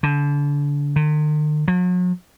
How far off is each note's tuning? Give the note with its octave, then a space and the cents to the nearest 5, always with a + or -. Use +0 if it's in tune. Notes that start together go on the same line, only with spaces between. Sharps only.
D3 -30
D#3 -45
F#3 -45